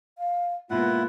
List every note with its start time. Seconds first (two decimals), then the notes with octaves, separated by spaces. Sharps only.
0.18 F5
0.70 G#2 B2 A#3 E4 F4 F#5